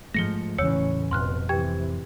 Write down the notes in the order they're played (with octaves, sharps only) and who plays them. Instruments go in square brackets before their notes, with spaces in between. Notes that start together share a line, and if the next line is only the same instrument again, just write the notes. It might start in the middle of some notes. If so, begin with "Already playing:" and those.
[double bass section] G#2 [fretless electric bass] F3 F#3 A3 [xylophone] A#6 C#7 G7
[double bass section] A1 C#4 [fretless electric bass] E2 C#3 E3 [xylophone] C#5 E6 C#7
[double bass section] F1 B2 [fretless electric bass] F2 [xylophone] C6 F6 F#6
[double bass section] C3 E3 [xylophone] G4 G5 G#6